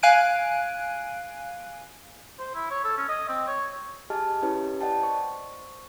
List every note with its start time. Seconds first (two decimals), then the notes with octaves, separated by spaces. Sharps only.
0.03 F5 G#5 F#6 G#6 D7 D#7
2.39 C5
2.55 E4
2.70 C#5
2.85 A4
2.98 C#4
3.09 D#5
3.29 C4
3.48 C#5
4.10 G4 G#4 D#5 G#5 A5 F6
4.42 C#4 E4 G4 B4 C#5
4.81 D5 D#5 F#5 G5 A5
5.02 C5 C#6